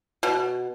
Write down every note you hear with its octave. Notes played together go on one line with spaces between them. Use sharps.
B2